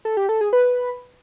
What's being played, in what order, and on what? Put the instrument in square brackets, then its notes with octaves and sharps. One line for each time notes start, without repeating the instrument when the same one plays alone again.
[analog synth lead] A4
G4
A4
G#4
B4